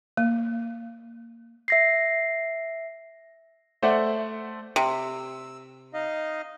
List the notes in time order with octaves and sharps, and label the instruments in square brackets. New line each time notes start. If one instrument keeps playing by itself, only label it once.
[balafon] A#3
[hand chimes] E5 A#6 C7
[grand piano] A3 C5 D5 E5 F#5
[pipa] C3 [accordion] E6
[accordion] D#4 D#5 F5